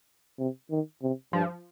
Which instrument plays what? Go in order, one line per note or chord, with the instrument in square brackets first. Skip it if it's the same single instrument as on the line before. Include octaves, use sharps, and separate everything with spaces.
[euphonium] C3
D#3
C3
[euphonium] G2 [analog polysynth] F3